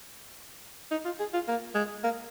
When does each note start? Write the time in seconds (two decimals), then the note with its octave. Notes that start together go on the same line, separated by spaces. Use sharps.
0.91 D#4
1.05 F4
1.20 G#4
1.34 F4
1.48 A#3
1.75 G#3
2.04 A#3